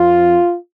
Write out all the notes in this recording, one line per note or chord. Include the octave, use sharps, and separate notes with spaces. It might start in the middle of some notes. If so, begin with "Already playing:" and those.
Already playing: F2 F3 F4